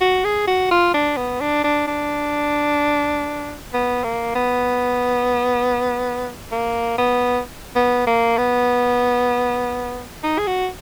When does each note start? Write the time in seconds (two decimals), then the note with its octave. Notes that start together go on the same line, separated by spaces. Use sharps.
0.01 F#4
0.24 G#4
0.47 F#4
0.71 F4
0.94 D4
1.17 B3
1.41 D4
1.64 D4
1.88 D4
3.74 B3
4.04 A#3
4.35 B3
6.52 A#3
6.98 B3
7.76 B3
8.07 A#3
8.38 B3
10.24 D#4
10.38 G#4
10.47 F#4